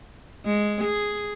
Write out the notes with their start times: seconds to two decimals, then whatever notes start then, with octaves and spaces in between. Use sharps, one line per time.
0.45 G#3
0.84 G#4